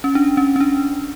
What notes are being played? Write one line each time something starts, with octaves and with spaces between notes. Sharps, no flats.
C#4
D4
C#4
C#4
D4